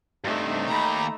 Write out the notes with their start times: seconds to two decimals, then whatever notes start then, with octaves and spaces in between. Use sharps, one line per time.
0.24 G2 C3 A3 D#4
0.68 D#2 G4 A#5 B5